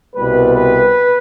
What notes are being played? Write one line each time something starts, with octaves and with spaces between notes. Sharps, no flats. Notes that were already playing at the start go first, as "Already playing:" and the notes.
C2 B2 G3 B4
B4